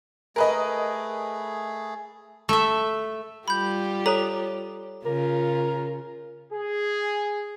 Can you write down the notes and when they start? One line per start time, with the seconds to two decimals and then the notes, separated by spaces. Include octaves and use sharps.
0.36 A3 G#4 A#4 B4 D#5
2.49 A3 E5
3.48 G3 F4 G4 B5 G6
4.06 A4 C#5 A#5 D#6
5.06 C#3 F4 A#4
6.51 G#4